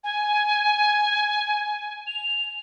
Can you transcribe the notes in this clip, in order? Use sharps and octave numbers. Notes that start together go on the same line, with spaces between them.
G#5
F7